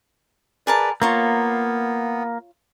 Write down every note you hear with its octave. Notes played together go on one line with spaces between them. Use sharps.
G#4 A#4 B4 D5 A5
A#3 B3 F4 C#5 A#5